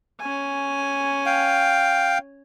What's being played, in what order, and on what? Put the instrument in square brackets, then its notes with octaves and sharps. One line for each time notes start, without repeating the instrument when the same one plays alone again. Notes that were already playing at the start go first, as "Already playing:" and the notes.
[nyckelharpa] C#4 G#5
[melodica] F5 G5